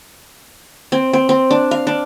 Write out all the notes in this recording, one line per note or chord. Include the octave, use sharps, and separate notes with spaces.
C4
C4
C4
D4
F5
D4